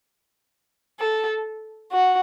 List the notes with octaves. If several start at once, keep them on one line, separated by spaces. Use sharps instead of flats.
A4
F#4